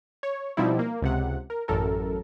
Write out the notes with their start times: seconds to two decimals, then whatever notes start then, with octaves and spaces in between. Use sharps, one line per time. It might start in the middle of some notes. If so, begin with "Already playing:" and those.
0.23 C#5
0.57 B2 F3 G3 C4 D#4 E4
0.79 A#3
1.02 C#2 C3 F#5
1.50 A#4
1.68 A1 F#2 A4 A#4